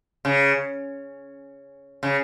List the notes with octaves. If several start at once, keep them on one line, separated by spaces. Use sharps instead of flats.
C#3
C#3